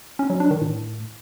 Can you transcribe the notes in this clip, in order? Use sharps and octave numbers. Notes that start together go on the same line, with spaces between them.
C#4
F#3
D4
D#3
A2